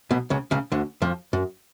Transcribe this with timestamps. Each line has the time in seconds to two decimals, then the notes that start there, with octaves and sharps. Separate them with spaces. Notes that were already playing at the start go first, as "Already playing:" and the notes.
0.11 B1 B2
0.30 C#2 C#3
0.51 C#2 C#3
0.72 D2 D3
1.02 F2 F3
1.33 F#2